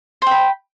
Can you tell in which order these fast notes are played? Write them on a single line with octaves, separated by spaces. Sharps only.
C5 G5 B5